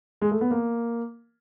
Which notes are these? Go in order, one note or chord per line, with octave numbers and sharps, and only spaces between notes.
G#3
A3
B3
A#3